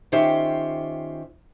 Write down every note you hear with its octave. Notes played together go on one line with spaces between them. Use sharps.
D#3 C#4 F4 G4 C5 E5